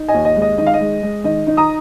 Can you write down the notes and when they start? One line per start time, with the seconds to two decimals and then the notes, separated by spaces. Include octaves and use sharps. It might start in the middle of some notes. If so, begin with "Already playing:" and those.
Already playing: D#4
0.08 D#5 G#5
0.14 D#2
0.25 D#5
0.36 G#3
0.42 D#5
0.58 D#3 D#5
0.67 F5
0.74 D#5
0.81 G#3
1.03 G#3
1.24 D#3 D#5
1.47 D#4
1.57 A#5 D#6